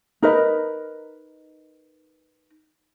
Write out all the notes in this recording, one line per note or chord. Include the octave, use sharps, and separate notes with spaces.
D#4 A#4 B4 D#5